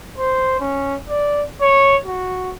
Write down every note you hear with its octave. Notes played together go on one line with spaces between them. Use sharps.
C5
C#4
D5
C#5
F#4